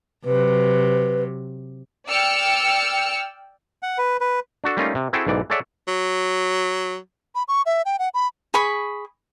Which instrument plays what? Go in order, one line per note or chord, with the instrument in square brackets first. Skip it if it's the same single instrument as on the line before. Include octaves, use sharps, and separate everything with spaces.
[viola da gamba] C3 F#3 [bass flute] B4
[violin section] D5 G5 E6 F6 C#7
[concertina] F#5
B4
B4
[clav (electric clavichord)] D4 F#4 A4
G3 A3 A#3 C#4 D#4 F4
C3
C4 E4 F#4 G#4 A4 G5
B1 G#2 E3 D5
G#4 A4 C#5 D5 E5 F#5
[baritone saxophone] F#3
[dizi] B5
C#6
E5
G5
F#5
B5
[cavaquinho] G#4 B5 C#6